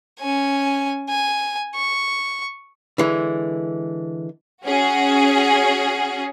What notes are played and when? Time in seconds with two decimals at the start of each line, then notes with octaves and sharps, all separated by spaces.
0.19 C#4 G#5
1.09 G#5
1.75 C#6
2.98 D3 E3 G#3
4.64 C#4 F#4 G#4